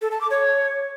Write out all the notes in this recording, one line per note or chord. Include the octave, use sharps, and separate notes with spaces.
A4
A5
D6
C#5